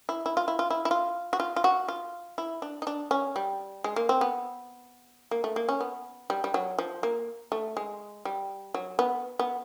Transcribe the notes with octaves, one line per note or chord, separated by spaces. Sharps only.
E4
E4
F4
E4
F4
E4
E4
F4
F#4
F4
F4
F#4
F4
E4
D4
D#4
D4
C#4
G3
G#3
A#3
C4
B3
A#3
A3
A#3
C#4
B3
G3
G3
F#3
F3
A#3
A3
G#3
G3
F#3
B3
B3